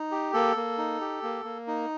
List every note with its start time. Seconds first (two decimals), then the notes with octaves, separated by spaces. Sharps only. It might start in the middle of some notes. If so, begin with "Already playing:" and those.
Already playing: D#4
0.11 G4
0.33 A#3 A4
0.57 A#3
0.78 D#4
1.01 G4
1.23 A#3
1.45 A#3
1.68 D#4